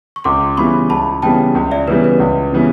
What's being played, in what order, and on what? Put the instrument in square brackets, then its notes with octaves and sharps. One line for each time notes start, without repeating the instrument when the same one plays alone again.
[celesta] C#6
[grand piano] C#2 [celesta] C6 D6
[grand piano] C#3 E3 G3 B3 [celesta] B5 C#6
[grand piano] C#2 [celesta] A5 B5
[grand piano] C#3 E3 G3 B3 [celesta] G5 A5
[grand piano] C#2
[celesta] D5 E5
[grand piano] C#3 E3 G3 B3 [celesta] B4
[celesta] B4
[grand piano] C#2
C#3 E3 G3 B3